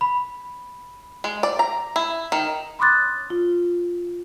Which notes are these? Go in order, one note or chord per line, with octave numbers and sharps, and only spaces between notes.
B5
G#3
D5
A#5
E4
D#3
B5 C6 D6 D#6 F#6 A6
F4